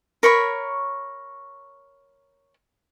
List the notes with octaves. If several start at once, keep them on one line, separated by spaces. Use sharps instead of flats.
A#4 C#5 B5 C#6